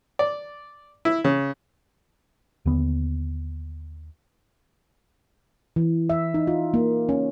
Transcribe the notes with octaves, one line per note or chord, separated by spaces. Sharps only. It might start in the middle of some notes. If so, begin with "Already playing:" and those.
D5
E4
C#3
D#2 D3 B3
E3
E5
D#4
F4
A#3
C#4